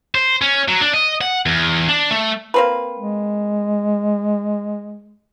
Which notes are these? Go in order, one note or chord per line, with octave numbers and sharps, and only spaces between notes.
C5
C#4
F#3
D4
D#5
F#5
E2
D4
A3
A#3 C4 B4
G#3